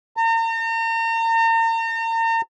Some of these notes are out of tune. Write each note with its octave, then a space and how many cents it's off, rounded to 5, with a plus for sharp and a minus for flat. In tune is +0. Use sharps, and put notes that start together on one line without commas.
A#5 -40